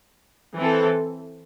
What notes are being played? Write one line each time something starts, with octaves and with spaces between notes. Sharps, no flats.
E3 C4 A4